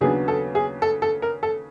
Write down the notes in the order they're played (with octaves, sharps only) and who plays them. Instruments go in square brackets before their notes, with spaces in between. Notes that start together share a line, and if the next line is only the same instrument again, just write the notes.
[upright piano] D#2 C#3 F#3 B3 D4 G#4
A4
G#4
A4
A4
A#4
A4